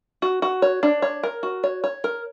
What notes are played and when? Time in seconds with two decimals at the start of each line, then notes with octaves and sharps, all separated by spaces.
0.22 F#4
0.42 F#4
0.62 C#5
0.83 D4
1.02 C#5
1.23 A#4
1.43 F#4
1.64 C#5
1.84 C#5
2.04 A#4